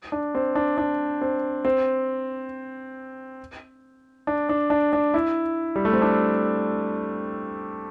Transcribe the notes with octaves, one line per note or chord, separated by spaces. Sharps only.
D4
C4
D4
D4
C4
C4
D4
D4
D4
D4
E4
G3
A3
C4
D4